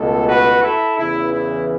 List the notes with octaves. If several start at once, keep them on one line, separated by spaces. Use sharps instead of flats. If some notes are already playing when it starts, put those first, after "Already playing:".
Already playing: C#2 B2 A3 A4
F#4 B4
E4 A4
E2 C#3 E3 E4
E4